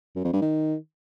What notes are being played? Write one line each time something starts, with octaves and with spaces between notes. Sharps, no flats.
F#2
F2
G2
D#3